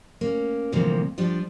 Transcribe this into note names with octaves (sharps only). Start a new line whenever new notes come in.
A#3 C#4
D2 C3 E3 F3 G3 A#3
F3 G3 D4 G4